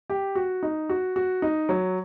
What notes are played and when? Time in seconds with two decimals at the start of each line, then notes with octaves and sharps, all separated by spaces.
0.10 G4
0.35 F#4
0.63 D#4
0.89 F#4
1.16 F#4
1.42 D#4
1.69 F#3